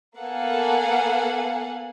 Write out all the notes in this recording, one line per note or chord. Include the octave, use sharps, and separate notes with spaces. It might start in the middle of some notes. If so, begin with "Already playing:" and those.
A#3 B3 A4 F5 F#5 G#5